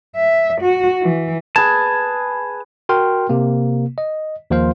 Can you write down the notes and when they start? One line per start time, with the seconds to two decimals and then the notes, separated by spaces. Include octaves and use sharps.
0.15 E5
0.62 F#4
1.02 E3
1.56 G#4 B4 A5 G#6
2.89 F#4 A#4 G5 C6 F6
3.29 C3 A#3
3.98 D#5
4.50 D#2 F3 A#3 F4 C5 F5